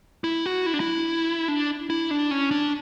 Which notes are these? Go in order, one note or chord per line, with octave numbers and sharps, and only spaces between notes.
E4
F#4
E4
D4
E4
D4
E4
D4
C#4
D4